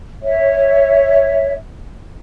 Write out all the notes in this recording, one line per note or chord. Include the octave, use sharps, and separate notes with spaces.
C#5 E5